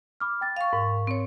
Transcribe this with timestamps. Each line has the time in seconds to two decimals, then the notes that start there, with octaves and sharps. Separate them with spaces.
0.20 B5 D6 F6
0.41 G5 A6
0.57 F5 C#6
0.73 G#2 A#4 C#6
1.07 C4 C#5